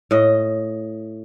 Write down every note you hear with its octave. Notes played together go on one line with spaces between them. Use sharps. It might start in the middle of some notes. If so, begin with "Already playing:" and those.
A2 D#5